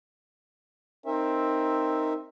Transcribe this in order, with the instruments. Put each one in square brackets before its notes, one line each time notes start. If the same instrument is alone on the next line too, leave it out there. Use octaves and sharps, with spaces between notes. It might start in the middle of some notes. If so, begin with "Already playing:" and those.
[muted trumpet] C4 [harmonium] D#4 A#4 E5